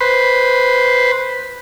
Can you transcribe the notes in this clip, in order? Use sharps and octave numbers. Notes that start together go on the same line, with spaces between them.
B4 C5